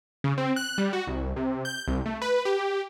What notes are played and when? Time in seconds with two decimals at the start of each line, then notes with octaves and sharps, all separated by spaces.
0.24 C#3
0.38 C4
0.56 F#6
0.78 G3
0.93 F#4
1.07 C2
1.36 C3
1.65 G6
1.88 C2
2.06 A3
2.22 B4
2.45 G4